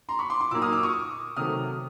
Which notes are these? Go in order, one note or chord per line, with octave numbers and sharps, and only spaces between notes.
A#5 C6
B5 C#6
C6 D6
C6 D6
A#2 F#3 A#3 D#4 D6 E6
D#6 F6
D6 E6
C#6 D#6
C3 D#3 F#3 A3 D#6 F6